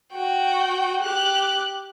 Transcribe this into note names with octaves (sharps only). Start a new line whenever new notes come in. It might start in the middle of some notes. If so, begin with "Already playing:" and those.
F#4 G5
G4 F#6